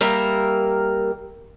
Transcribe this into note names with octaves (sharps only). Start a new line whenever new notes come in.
G3 A#3 A#4 E5